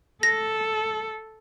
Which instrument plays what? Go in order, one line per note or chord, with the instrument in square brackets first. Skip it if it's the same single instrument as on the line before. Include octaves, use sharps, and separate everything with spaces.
[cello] A4 [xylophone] A#6